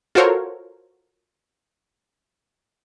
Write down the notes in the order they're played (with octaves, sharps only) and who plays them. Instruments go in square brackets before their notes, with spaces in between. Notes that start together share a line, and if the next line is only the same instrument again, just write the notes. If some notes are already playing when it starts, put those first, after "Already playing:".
[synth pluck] F4 F#4 A4 A#4 C5 C#5